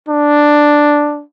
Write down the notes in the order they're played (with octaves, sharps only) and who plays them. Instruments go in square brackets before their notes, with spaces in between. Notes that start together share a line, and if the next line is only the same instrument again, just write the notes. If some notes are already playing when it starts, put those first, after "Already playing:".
[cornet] D4